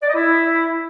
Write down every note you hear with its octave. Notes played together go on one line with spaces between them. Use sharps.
D5
D#5
E4